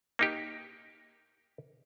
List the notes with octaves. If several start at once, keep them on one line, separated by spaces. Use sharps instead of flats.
A#3 D#4 G4